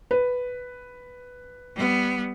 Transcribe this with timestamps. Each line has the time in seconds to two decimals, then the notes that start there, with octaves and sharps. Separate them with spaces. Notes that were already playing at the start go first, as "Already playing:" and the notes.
0.11 B4
1.75 G3 B3